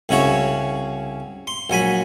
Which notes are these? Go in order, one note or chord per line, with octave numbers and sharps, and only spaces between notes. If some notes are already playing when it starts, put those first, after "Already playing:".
C2 C#3 E4 F#4 C#5
C6
A#1 F#3 G#5 B5